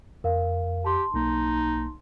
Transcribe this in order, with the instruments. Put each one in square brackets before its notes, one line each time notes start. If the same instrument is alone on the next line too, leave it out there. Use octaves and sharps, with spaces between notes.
[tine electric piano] F2 [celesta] A#4 F5
[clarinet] G4 [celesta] A5 C6
[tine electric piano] B1 A#3 [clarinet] D#4